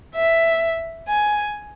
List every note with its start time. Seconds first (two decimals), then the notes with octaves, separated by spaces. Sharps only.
0.15 E5
1.08 G#5